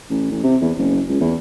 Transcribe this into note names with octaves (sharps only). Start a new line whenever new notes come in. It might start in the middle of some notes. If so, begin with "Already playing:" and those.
A1
A1
C3
E2
F#1
C#2
E2